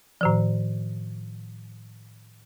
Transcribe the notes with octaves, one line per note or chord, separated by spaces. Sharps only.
A2 D#3 F3